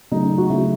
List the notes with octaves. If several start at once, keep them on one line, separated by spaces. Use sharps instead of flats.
C#3 F#3 A3 D#4
F#4
C#3 F#3 A3 E4